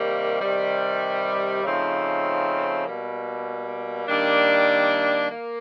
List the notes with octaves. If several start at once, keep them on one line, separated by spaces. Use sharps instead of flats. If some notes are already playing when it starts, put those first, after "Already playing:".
Already playing: C3 D#3 G3 A#3
C3 D#3 G3
C#3 F3 A3 C4 D#4
B2 G3 A#3
D#3 G3 A#3 D4
A#3